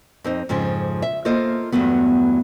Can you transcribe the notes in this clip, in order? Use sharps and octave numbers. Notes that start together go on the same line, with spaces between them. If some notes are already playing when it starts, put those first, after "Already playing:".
F2 C4 D#4
F2 G#2 C#3 F3
E5
A#3 F4 A4 C5 D#5
E2 G2 F#3 A3 B3